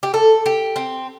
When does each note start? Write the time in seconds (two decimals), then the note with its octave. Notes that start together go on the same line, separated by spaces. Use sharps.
0.03 G4
0.14 A4
0.46 G4
0.76 C4